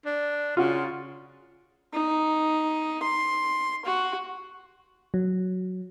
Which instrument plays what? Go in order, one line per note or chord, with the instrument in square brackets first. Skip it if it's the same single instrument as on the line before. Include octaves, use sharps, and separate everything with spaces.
[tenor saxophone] D4
[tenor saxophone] C#3 [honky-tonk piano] F4 F#4
[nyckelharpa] D#4
C6
F#4
[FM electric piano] F#3